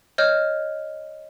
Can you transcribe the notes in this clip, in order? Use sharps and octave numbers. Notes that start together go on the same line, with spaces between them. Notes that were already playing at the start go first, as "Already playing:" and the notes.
C#5 D#5 F6 G6